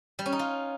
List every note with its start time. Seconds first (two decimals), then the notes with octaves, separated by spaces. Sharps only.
0.19 G3
0.26 C#4
0.32 D#4
0.39 F4